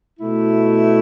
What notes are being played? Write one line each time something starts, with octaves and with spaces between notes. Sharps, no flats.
B2 A3 E4